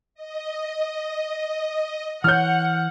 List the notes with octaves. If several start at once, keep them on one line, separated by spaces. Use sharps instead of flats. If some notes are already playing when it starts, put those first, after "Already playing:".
D#5
E3 C#5 F#5 F6 G6